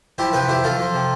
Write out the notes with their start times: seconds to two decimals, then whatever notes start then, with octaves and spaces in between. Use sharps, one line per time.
0.18 F3 E4 G4
0.33 C3 G4 B4
0.48 F2 E4 G4
0.64 F2 F4 A4
0.79 F3
0.94 C3